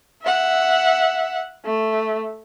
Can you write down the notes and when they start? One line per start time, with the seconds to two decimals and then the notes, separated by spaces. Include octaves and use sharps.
0.22 E5 F#5
1.65 A3